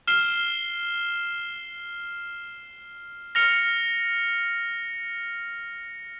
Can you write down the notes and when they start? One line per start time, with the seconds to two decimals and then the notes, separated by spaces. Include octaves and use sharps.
0.08 F6 C7 E7 G7
3.35 F6 A#6 C#7 F7